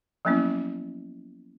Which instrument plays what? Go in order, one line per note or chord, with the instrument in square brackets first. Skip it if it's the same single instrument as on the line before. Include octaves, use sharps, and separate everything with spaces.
[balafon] F3 F#3 A#3 B3 C#4 E4